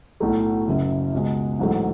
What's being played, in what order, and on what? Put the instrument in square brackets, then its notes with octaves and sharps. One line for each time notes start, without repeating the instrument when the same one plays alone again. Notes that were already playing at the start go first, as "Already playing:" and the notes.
[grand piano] B1 A2 F#3 A3
F#1 F#2 C#3
C#2 B2 G#3
A1 G#2 F#3 A3